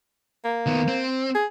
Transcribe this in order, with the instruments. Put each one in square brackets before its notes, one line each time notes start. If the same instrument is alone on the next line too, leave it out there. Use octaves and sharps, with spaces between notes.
[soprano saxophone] A#3
[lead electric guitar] D#3 B3
C4
[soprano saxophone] G#4